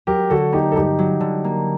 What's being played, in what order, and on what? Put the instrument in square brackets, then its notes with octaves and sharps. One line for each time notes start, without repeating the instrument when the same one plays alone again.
[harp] F#3 [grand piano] G4 A#4
[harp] D3 [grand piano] F#4 A4
[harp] A#3 [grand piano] D#4 G4
[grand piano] A4
[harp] G2 [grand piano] D#4 G4
[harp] F#3
D3
A#3